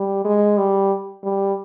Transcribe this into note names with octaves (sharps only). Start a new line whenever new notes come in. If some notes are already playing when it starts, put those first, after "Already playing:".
Already playing: G3
G#3
G3
G3